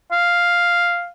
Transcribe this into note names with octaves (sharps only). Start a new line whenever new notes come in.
F5